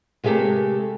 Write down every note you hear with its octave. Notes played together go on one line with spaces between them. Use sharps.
C3 G#3 A3 G4 A4 A#4